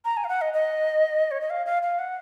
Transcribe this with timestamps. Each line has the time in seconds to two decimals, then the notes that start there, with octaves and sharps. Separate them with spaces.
0.05 A#5
0.17 G#5
0.24 F5
0.29 F#5
0.41 D#5
0.54 D#5
1.31 C#5
1.41 D#5
1.50 F5
1.66 F5
1.83 F5
1.99 F#5